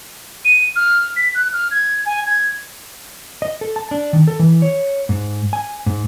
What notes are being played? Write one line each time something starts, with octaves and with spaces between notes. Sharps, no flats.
D#7
F6
B6
F#6
F6
G#6
G#5
G#6
D#5
A4
A5
D4
D#3
A4
E3
C#5
G#2
G#5
G#2